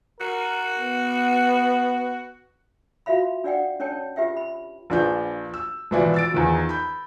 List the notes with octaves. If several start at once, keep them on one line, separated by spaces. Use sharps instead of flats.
F#4 A#4
B3
F4 F#4 E5 F5 B5
D4 D5 F#5 G5
C#4 D4 C#5 G5 A5
F4 G4 B4 E5 G5
B5
A#1 F3 D4 B4 G6
E6
G#1 B2 E3 F3 E4 D5
E6 A6 D7
E2 D#3 F3
B5 G6